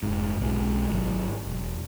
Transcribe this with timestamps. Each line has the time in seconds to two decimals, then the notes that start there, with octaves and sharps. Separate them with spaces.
0.03 F1 G#2
0.40 B1 F#3 G#3
0.91 G#1 F#3
1.47 E1